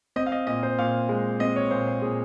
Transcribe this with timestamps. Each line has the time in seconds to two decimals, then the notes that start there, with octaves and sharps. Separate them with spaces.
0.16 C4 D#5
0.26 F5
0.32 D#5
0.47 A#2 D#5
0.63 C5
0.79 A#2 F5
1.09 G#3
1.40 C4 D#5
1.56 C#5
1.71 A#2 C5
1.87 C5
2.02 A#2 G#4